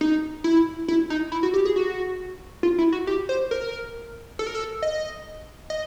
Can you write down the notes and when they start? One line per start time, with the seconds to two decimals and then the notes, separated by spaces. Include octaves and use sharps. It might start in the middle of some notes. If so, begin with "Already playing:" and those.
0.01 D#4
0.44 E4
0.88 E4
1.10 D#4
1.32 E4
1.43 F#4
1.54 G4
1.65 G#4
1.76 F#4
2.63 F4
2.78 E4
2.92 F#4
3.07 G4
3.29 C5
3.51 A#4
4.39 A4
4.47 A#4
4.55 A4
4.82 D#5
5.70 D#5